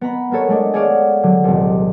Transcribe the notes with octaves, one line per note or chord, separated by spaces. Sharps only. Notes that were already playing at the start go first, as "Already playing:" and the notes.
B3 A#5 B5
A#3 B3 A4 C#5
G#3 A3 D4
G#4 A4 C#5 D5 F5 F#5
D3 F#3
D#1 C2